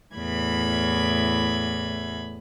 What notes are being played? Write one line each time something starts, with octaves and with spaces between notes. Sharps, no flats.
E2 A2 B5 G#6